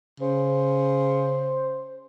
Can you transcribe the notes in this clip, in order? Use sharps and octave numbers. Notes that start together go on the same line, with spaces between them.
C#3 C5